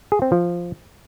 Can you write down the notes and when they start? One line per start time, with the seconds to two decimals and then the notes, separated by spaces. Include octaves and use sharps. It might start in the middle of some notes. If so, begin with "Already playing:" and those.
0.12 G#4
0.22 C4
0.32 F3